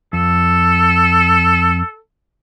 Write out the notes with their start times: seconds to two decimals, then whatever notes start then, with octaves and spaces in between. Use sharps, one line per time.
0.13 F2 A4